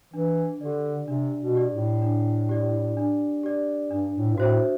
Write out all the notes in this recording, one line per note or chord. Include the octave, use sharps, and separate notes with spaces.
E3 D4
D3 G4 D5
C3 D4
B2
G4 D5
A2
D4
G4 D5
D4
G4 D5
G2 D4
A2
G2
A2 F#4 C5 E5